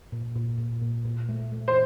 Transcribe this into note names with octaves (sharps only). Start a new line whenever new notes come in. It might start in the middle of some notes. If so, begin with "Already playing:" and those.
A#2
A#2
A#2
A#2
A#2
A3
A3
C5